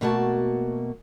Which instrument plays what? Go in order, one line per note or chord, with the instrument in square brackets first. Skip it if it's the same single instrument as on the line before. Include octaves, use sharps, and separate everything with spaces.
[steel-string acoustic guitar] B2 A3 A#3 F#4 C#5 A5